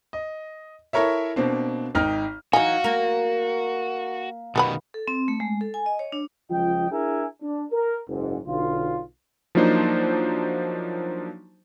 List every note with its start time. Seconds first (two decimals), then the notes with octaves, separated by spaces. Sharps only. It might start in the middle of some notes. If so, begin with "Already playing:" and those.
0.13 D#5
0.93 E4 A4 A#4 C#5 E5
1.36 B2 A#3 C4 D4
1.95 G#1 D#4 G5 F6
2.53 E3 F#3 D#4 F#4 F5 G#5
2.84 A#3 A#4
4.56 B2 D#3 G3 B3 B5
4.94 A4
5.08 C4
5.28 A3
5.40 G#3
5.61 A4
5.74 G#5
5.86 D#5
5.99 C#5
6.12 D4
6.51 C#2 F3 F4 D#5 G5
6.91 D4 E4 G#4 A#4 E5 G#5
7.42 D4
7.72 A#4
8.08 F#1 G#2
8.46 B1 D3 F4
9.55 F3 F#3 A#3 D4 D#4 C5